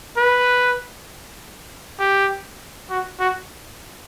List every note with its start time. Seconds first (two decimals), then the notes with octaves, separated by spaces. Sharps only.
0.17 B4
1.99 G4
2.90 F#4
3.20 F#4